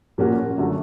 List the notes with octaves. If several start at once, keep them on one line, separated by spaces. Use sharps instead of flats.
A#2 F3 A#3 C#4 F#4
F#2 D3 F#3 A3